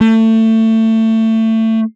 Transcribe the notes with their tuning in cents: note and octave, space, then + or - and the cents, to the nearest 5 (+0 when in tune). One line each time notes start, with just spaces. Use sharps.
A3 +25